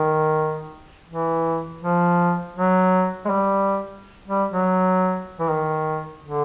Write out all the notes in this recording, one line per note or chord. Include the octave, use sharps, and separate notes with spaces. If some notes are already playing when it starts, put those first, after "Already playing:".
Already playing: D#3
E3
F3
F#3
G#3
G3
G3
F#3
E3
D#3
D3